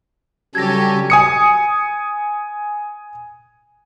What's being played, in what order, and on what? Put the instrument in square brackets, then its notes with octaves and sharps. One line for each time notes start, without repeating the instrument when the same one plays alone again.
[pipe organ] C#3 F#3 G3 [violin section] C#4 G4 A4 [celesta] G#6 A#6
[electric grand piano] G#5 D#6 C#7